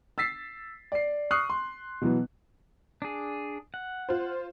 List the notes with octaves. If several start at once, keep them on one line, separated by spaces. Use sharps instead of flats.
E6 A6 B6 C7
D5 C7
C#6 D#6 F6 F#6 C7
C6
B2 E3 F#3 B3
D4 G#4
F#5
F4 C5